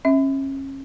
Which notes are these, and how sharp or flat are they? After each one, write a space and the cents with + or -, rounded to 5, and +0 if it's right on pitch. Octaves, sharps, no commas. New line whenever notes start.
C#4 -30 E5 -25